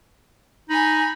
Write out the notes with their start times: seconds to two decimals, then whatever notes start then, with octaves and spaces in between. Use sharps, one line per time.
0.69 D#4 G#5 B5